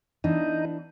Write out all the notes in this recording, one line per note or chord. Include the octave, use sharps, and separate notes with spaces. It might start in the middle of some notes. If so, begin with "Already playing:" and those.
E3 B3 D4 D#4